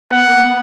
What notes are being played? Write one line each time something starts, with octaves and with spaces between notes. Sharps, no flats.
B3 F#5
A#3
B3